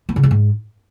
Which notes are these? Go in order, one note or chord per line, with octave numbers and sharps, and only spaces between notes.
B3
C#3
G#3
G#2